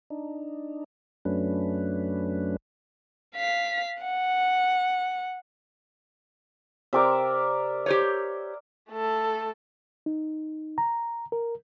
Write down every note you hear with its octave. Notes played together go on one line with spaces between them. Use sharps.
D4 D#4
F#2 F#3 A3 C#4 D4 B4
F5 B6
F#5
C3 C4 A#4 D5 E5
G4 C5 C#5
A3 A4
D#4
A#5
A#4